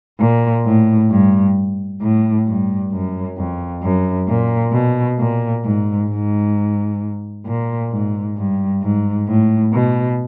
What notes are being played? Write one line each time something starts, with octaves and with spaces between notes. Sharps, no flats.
A#2
A2
G2
A2
G2
F#2
F2
F#2
A#2
B2
A#2
G#2
G#2
A#2
G#2
G2
G#2
A2
B2